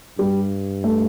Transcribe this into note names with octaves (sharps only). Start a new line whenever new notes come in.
G2 G3
A3